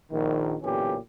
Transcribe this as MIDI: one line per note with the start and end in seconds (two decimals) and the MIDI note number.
0.11 0.54 34
0.11 0.54 51
0.63 0.96 35
0.63 0.96 46
0.63 0.96 50
0.63 0.96 52
0.63 0.96 61
0.63 0.96 67